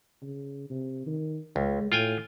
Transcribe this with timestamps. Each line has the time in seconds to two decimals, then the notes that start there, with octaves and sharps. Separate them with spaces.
0.22 C#3
0.70 C3
1.06 D#3
1.56 C#2 G#3
1.92 A2 F4 G5 G#5